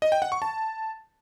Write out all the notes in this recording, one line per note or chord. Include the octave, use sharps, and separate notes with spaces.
D#5
G5
F#5
C#6
A5